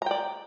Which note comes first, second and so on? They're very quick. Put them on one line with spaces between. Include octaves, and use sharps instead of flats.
A#5 G5 D5